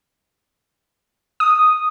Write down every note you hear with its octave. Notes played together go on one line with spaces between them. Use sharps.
D#6